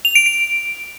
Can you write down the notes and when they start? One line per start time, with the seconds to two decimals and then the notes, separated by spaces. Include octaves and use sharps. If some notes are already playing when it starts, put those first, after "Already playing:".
0.05 F7
0.15 D7
0.26 D7